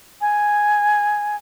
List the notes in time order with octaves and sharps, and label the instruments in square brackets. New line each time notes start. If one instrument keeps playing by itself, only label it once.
[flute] G#5